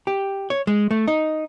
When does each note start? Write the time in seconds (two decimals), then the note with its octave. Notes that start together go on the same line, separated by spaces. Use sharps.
0.07 G4
0.50 C#5
0.67 G#3
0.91 A3
1.08 D#4